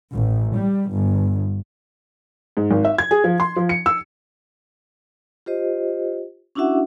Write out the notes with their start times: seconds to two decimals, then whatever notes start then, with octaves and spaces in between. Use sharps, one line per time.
0.13 A1
0.54 G3
0.90 G1
2.57 G#2
2.71 G#1
2.85 E5
2.98 G#6
3.11 G#4
3.24 F3
3.40 C6
3.56 F3
3.69 C#7
3.86 E6
5.46 F4 G4 C5 D#5
6.55 C#4 D4 E4 F#4 E5 F#5